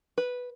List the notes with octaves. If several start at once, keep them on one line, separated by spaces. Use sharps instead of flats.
B4